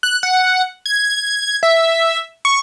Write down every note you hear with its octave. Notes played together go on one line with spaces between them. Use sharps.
F#6
F#5
G#6
E5
C#6